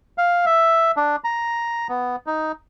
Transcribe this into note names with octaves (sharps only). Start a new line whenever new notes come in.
F5
E5
D4
A#5
B3
D#4